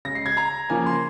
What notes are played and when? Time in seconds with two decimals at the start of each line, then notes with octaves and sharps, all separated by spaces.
0.05 C#3 G#3 A#6
0.15 C7
0.26 G#6
0.37 A#5
0.70 C#3 F3 A#3 G#5
0.86 C6